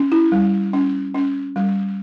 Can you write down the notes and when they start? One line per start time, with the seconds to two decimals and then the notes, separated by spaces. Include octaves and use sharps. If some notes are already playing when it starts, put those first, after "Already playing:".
Already playing: C#4
0.12 E4
0.32 G3
0.73 C#4
1.14 C#4
1.56 G3